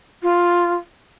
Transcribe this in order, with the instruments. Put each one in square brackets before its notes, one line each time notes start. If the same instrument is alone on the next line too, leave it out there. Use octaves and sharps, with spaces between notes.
[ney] F4